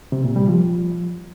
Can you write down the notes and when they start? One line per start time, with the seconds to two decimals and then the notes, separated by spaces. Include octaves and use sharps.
0.12 C3
0.24 A#2
0.36 G3
0.48 F3